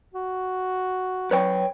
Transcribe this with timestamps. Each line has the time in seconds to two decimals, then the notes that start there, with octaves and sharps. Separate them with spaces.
0.13 F#4
1.31 F#3 B4 C#5 G5